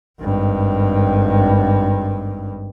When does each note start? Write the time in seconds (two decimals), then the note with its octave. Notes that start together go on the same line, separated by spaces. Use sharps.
0.21 G#1 G2